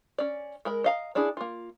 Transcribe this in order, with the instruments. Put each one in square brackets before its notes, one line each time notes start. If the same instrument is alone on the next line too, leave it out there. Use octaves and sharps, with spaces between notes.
[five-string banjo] C#4 D5
G#3 A#4 B5
D#5 F5 A#5
C#4 D4 E4 G#4
A#3 F4